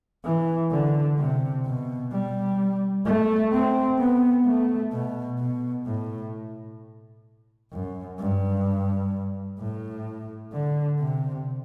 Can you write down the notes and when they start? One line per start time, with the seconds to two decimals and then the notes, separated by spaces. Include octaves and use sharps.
0.25 E3
0.71 D3
1.18 C3
1.65 B2
2.11 G3
3.05 A3
3.52 C4
3.98 B3
4.45 A3
4.92 B2
5.38 B2
5.86 A2
7.72 F#2
8.19 G2
9.59 A2
10.53 D3
11.00 C3